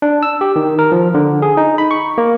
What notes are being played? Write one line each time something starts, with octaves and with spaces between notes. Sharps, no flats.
D4
E6
G4
D#3
A#4
F3
D3
G#4
D#4
B5
C#6
A#3